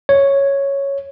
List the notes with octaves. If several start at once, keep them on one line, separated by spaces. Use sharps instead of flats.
C#5